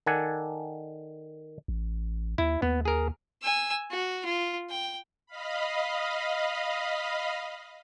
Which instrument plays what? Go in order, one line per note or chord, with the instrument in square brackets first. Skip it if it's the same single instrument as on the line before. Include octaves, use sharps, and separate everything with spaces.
[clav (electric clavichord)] D#3 A4 D5 F#5 G#5
[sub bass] A1
[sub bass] D#2 [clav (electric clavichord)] E4
[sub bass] D#2 [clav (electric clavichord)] B3
[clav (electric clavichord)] G#4 A#4
[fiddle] G#5 E6
F#4
F4
G5
[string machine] D#5 F5 B5